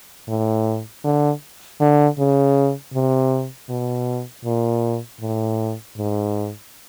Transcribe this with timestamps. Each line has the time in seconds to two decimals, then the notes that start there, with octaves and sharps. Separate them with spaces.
0.28 A2
1.04 D3
1.81 D3
2.19 C#3
2.94 C3
3.69 B2
4.45 A#2
5.21 A2
5.97 G#2